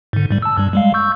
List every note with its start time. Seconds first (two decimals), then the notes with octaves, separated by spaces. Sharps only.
0.13 G#2 D3
0.31 G#2 G3
0.42 A5 E6
0.57 G2 G3
0.73 G3 G#3 F5
0.94 C#6 E6 G6